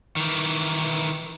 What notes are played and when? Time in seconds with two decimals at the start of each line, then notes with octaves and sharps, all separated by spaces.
0.16 D#3 E3